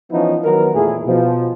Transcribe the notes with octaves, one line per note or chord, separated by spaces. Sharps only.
E3 F3 B3 C#4 D#4 E4
D#3 F#3 B3 A#4
E2 A#2 A3 E4 G#4
B2 F3